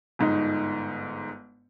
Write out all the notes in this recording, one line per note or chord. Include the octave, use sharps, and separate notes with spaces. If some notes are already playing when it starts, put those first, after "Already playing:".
G1 G#2 D#4